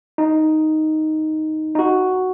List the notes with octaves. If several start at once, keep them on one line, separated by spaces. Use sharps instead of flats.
D#4
D#4
F#4